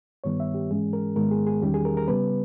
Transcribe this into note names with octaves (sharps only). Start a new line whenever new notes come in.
G2 D#3 G3 B3 C#5
E5
G4
G#2 E3 G#3 C#4 G#4
A#4
G#2 D#3 G#3 B3 A#4
G#4
G#4
E2 D#3 G3 C#4 G4
G#4
A#4
A#4
C#3 G3 B3 B4